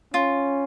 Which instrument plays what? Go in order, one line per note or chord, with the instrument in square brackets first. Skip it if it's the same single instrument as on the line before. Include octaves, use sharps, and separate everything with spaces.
[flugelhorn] C#4 [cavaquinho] F4